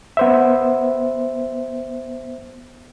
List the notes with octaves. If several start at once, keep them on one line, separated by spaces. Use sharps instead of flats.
B3 C5 E5